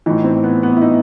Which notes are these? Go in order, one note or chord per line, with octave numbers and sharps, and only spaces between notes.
A2 E3 D#4
C4
B3
B3
E4
D#4